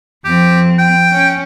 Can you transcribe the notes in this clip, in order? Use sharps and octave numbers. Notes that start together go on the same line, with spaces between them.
F2 C4 G4
G5
C#4